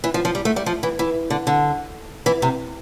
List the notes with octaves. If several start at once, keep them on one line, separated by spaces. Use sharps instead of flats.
E3
F3
F3
G3
A3
G3
F3
E3
E3
D3
D3
E3
C3